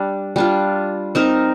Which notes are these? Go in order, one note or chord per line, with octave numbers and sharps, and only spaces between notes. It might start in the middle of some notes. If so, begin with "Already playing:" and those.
Already playing: G3 D4
G3 D4 F4
C4 D#4 A#4